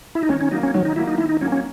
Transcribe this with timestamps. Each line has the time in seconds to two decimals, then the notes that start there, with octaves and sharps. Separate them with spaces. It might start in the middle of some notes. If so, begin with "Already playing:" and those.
0.15 E4
0.23 D#4
0.29 D#3 C#4
0.41 C#4
0.51 F#3 A#3 D#4
0.63 C#4
0.74 D#3 F#3
0.85 D#4
0.96 F#3 A#3 E4
1.07 D#4
1.18 D#3 E4
1.29 D#4
1.41 F#3 A#3 C#4
1.52 C#4